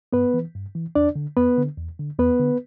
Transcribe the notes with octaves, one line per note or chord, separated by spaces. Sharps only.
G2 B3 B4
E3
G2
E3
E2 D4 D5
D3
E2 B3 B4
D3
E2
D3
E2 B3 B4
D3